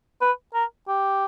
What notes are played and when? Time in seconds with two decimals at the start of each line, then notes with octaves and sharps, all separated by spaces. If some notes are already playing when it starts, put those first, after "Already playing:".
0.21 B4
0.54 A#4
0.88 G4